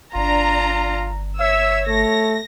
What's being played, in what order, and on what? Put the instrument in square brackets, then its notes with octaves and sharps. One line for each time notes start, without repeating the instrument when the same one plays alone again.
[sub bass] G1 [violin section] D4 A#5 [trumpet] F4
[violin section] C#5 E6 [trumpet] E5
[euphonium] A3 [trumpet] C#5 [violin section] A#6